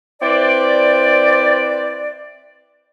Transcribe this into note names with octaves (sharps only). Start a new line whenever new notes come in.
C4 E4 B4 C5 D5